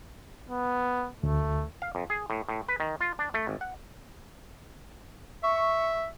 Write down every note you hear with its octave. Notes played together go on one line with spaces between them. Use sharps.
B3
D2 A3
F5
F2
G#4
A2
A2
B4
D#3
F4
D4
A3
G#1
F#5
E5 C#6